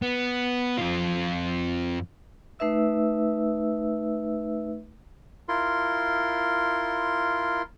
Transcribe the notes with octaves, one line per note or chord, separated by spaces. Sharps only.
B3
F2 F4
A3 D#4 B4 E5 E6
E4 F4 A#4 C6